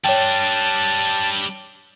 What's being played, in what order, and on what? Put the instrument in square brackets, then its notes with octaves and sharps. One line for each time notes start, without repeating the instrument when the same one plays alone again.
[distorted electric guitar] G3 D4 [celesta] C#5 G5 [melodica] A5